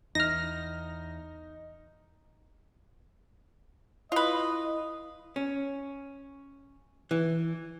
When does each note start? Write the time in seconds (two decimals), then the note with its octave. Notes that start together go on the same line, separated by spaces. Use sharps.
0.15 E2 D#4 F6 A#6
4.12 E4 F4 B4 D#5
5.36 C#4
7.11 E3